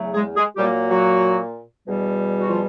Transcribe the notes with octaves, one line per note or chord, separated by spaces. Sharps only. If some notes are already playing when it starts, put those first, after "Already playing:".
Already playing: E2 C#3 F#3 A3
G#3 G#4
G#3 G#4
A#2 F#3 G3 A#3 G4
F#3 F#4
E2 B2 G3
F#4
F3 F4